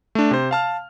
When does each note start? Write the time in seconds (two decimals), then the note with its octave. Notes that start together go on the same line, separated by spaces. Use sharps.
0.15 A3 D4
0.31 C3 C5
0.51 F5 A5 F6